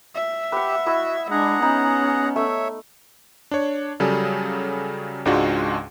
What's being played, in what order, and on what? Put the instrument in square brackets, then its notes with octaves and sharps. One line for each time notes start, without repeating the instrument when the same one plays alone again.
[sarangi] E5
[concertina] G4 [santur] B4 F#5
[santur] E4 D#5 [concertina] F#4
[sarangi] G#3 [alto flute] D4 [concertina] G#4 F#5 A#5
[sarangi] B3 [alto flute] C#4 [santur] D#4
[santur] A3 [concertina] C#5 E5
[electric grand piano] D4 C#5
C#3 F#3 G3 G#4 A4
C#2 G#2 G#3 D4 F4 F#4